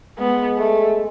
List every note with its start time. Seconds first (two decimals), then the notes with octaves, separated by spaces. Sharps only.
0.19 G#3 B3
0.58 A3